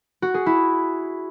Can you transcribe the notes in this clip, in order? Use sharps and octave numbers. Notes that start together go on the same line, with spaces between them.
F#4
G#4
E4